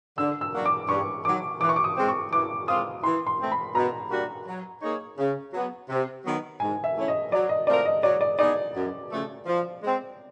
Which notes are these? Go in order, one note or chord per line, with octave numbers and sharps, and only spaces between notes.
D3 E6
E6
F#3 A#3 D4 F#4
D6
G2 C#6
D#3 F#3 D6
E3 D6
C#6
D6
D#6
G#3 C4
C#6
E3 D6
G#3 C4 F4 D#6
E3 C6
C6
A3 C4
B5
B2 A#5
G3 A#3 D4 F#4
F#3
A#3 D#4 G#4 C#5
C#3
F#3 B3
C3
D#3 F#3 B3
G#2 G#5
E5
E3 A3 C#4 E4
D#5
F#3 D5
D#5
A3 C4 F4 A#4 D5
D#5
F#3 D5
D5
B3 D#4 G#4 D5
F#2
C#3 F3 A3
F3
G#3 C4